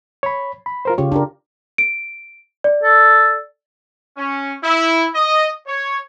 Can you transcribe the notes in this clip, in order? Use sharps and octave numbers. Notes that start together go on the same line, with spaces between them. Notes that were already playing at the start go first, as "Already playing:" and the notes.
C#5 B5
B5
F4 A#4 C5
C#3 F4 G4 C#5
D4 G4 A#4
D7
D5
A4
C#4
E4
D#5
C#5